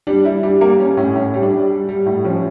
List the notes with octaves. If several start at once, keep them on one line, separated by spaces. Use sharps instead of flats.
G3 D4
G3 E4
G3 D4
G3 A#3
G3 C#4
A2 C#4
A2 C#4
G3
D4
G3
G3
G3
A2
F3 C#4